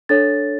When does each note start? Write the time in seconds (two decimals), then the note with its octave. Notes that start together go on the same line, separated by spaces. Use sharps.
0.09 D4 A4 C#5 A6